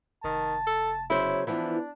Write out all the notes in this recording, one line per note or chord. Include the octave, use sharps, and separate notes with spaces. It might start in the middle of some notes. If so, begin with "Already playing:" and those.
F1 D#3 A5
A4
C#3 F#3 E4 C5
E3 F3 B3 D4 E4